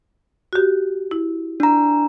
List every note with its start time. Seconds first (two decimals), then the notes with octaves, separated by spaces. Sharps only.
0.53 F#4 G4
1.11 E4
1.60 D4 A#5